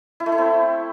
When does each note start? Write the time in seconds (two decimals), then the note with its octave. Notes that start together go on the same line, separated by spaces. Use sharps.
0.20 E4
0.26 A3
0.32 E4
0.38 C4